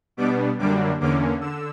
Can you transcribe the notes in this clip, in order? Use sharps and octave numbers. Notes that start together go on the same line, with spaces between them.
B2 G3 B3 D4 D6
F#2 D3 G3 A#3 D4 D6
E2 D3 A#3 C#4 D6
D3 E6